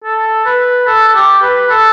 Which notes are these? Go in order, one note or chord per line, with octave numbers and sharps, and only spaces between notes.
A4
B4
A4
A4
G4
B4
A4